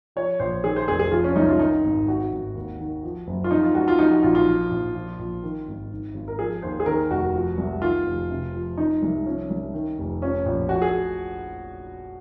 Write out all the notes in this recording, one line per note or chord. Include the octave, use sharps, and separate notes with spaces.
F3 C#5
A#1 C5
D#3 G#4
C5
F1 G#4
G#4
F3 F4
C#4
C2 D#4
F4
D#3 D#4
G#1
D#3 F#4
G#1
D#2
D#3
F3
F#1
F4
F3 D#4
F4
C#2 F#4
F4
F3 D#4
F#4
A#1 F4
F4
F3
A#1
F3
A#1
D#3
G#1
D#3
G#1
A#4
F3 G#4
D#2 C5
G#4
D#3 A#4
F1 F#4
F3
C2
D#3 F4
F1
C3
F3
F3 D#4
C2
F3 C#4
C2
D#3
F1
F3 C#4
A#1
F3 F#4
G#4